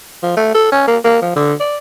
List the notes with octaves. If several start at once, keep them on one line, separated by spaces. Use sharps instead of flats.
F3
A3
A4
C#4
A#3
A#3
F3
D3
D5